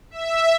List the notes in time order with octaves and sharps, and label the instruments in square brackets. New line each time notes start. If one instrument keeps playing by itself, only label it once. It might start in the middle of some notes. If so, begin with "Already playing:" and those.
[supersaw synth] E5